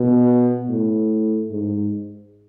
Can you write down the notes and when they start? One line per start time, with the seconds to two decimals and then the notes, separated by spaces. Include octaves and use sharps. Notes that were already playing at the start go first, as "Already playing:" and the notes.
Already playing: B2
0.68 A2
1.51 G#2